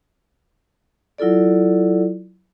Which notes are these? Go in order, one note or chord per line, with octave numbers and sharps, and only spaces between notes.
F#3 E4 F4 A4 D5